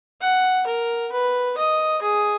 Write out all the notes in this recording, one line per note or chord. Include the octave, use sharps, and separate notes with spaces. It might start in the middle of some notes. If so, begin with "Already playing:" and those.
F#5
A#4
B4
D#5
G#4